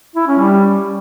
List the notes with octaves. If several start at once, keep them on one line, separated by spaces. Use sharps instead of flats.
E4
C#4
G3